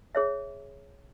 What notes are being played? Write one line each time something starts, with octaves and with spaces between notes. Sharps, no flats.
G#4 C#5 E5